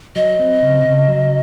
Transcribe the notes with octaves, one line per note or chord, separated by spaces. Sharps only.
F#3 D#5
C4
C#3
C#3
F#3